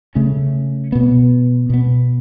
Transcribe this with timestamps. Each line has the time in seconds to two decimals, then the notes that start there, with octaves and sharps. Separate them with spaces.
0.15 C#3 A3 C#4
0.92 B2 B3
1.70 B2 B3